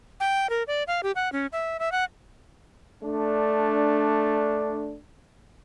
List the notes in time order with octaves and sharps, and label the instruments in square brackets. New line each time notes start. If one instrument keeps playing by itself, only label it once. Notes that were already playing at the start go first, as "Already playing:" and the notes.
[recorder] G5
A#4
D5
F5
G4
F#5
C#4
E5
E5
F#5
[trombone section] A3 D4